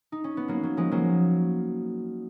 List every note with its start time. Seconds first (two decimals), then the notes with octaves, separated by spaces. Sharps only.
0.12 D#4
0.24 C#4
0.37 B3
0.48 F#3 A#3
0.63 F#3
0.77 F3 G#3
0.91 F#3 A#3